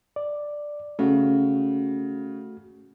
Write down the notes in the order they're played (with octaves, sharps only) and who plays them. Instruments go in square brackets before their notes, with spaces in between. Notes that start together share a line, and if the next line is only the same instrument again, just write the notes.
[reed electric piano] D5
[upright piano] C#3 [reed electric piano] A3 F#4